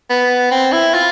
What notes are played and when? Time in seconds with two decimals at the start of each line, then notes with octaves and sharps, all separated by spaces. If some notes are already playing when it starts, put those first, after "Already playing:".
0.10 B3
0.51 C4
0.72 E4
0.94 F4